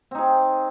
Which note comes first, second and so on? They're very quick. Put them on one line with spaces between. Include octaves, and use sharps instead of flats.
C4 D#4 G#4